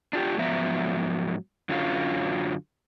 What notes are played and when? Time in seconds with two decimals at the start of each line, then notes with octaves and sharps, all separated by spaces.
0.13 D4 F4 G4
0.38 G#2 F3 F#3 B3 E5 A#5
1.69 F#2 D3 F#3 C#4 F4